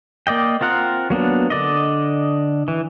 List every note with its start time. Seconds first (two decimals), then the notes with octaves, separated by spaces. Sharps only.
0.27 A#3 D5 D#5 G5
0.61 C4 F4 A#4 F#5
1.10 F#3 A#3 B3 D4
1.50 D3 D5 D#5
2.68 E3